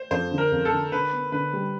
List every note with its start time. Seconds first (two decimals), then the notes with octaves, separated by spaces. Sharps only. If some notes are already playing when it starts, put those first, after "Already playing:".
Already playing: C5
0.11 F2 C5
0.31 D3
0.38 A#4
0.52 F2
0.65 A4
0.72 D3
0.92 D3 B4
1.12 B3
1.32 D3 B4
1.53 G3